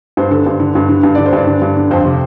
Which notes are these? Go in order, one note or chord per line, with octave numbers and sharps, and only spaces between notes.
G2 C5
D3 A4
G2 C5
D3
G2
D3
G2
D3 D5
C5
G2 D5
D3
G2
D3
F2 C5
C3